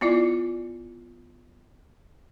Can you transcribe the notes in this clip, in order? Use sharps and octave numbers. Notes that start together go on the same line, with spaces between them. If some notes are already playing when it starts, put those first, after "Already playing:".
B3 E4 F4 D5 D6